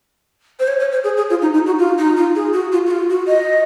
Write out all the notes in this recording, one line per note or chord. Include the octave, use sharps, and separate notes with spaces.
C5
C#5
C#5
C5
G#4
G#4
F4
D#4
D#4
F#4
F4
D#4
F4
G#4
F#4
F4
F#4
F4
F#4
D#5